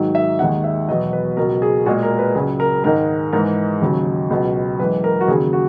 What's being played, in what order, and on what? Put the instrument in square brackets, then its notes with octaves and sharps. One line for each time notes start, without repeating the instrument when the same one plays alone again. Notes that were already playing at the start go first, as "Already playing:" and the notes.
Already playing: [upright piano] G#2 D#3 F#3
E5
D#2 D#3 G#3 F#5
E5
E2 B2 F#3 D#5
B4
C#2 B2 F#3 A#4
G#4
A#2 G#3 F#4
A#4
B4
C#2 C#3 F#3 G#4
A#4
G#2 D#3 G#3 A#4
G#2 E3 G#3 A#4
D#2 C#3 F#3
C#2 B2 F#3
F#2 E3 G#3 B4
A#4
F#4
D#2 C#3 F#3 G#4
F#4